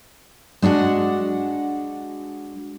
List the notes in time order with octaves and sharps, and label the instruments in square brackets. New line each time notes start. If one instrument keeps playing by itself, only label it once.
[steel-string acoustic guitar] G#3 D4 F#4 F#5